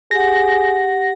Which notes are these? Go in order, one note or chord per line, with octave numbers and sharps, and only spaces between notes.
G4 G#4 F#5 A#6